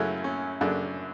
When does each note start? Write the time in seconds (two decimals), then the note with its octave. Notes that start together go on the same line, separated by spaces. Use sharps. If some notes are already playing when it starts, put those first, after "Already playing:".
Already playing: F#2 C#3 F#3 A3 C#4 E4
0.24 C#4
0.61 F#2 C#3 F#3 A3 D4